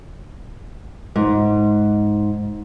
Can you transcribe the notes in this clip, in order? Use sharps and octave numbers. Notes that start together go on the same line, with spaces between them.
G#2